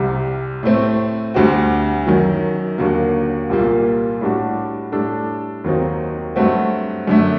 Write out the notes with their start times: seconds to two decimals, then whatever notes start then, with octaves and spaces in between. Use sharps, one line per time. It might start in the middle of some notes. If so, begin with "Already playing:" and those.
Already playing: C2 C3 G3
0.63 A2 A3 C4
1.34 D2 D3 G3 C4 F#4
2.06 F#2 D#3 F#3
2.78 D#2 D3 F#3 A#3
3.50 C2 A#2 G3 A#3
4.21 A2 G3 D4 F#4
4.92 A2 G3 D4 A4
5.64 D#2 D#3 F#3 C4 D#4
6.36 G2 F#3 A3 C4 F#4
7.07 F#2 D3 A3